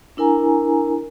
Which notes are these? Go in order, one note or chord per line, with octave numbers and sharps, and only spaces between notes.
D4 E4 A#4 G#5 A#5